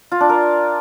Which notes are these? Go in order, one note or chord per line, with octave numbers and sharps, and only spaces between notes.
F4
D4
A#4